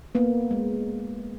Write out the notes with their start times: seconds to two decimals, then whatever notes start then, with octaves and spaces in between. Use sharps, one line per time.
0.15 A#3 B3
0.51 G#3